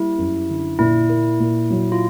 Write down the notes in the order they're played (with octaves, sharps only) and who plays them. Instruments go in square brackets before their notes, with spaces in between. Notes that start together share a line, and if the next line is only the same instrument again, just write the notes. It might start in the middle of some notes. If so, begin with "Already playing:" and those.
Already playing: [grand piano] G3 A#3 [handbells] E4
[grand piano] F#2
D3
[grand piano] A#2 [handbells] E4
[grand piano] A#3
A#2
F#3
[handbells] F4